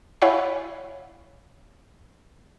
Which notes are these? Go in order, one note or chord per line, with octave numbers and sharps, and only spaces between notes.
E4 C#5 F5 F#5 G#5 B5